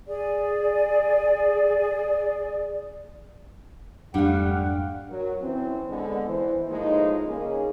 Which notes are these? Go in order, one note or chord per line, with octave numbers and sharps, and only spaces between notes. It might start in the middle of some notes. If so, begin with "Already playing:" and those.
G#4 D5
F2 G#2 G3 A3 D4 G4 F5 F#5
F#3 A#4
E3 C4 C#4
D3 G#3 B3
E3 C5
A2 F3 G#3 A#3 D#4
C#3 A#3 C#4 D#4 G#4